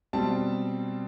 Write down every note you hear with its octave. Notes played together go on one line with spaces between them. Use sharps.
B2 G3 C4 A5